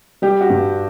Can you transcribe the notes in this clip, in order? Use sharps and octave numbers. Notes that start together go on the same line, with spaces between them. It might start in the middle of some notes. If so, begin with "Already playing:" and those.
G3 G4
F#4
G2